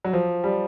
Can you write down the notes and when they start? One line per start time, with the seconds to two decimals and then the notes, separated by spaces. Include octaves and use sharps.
0.05 F#3
0.13 F3
0.44 G3